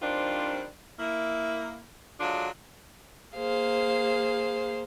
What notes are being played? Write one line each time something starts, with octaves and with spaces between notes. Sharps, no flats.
D#3 F3 G3 C4 D4 F4
A#3 E4
D3 F#3 G#3 D4 F4
A#3 G#4 C5 F5